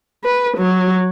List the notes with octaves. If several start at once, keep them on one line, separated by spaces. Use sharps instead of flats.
B4
F#3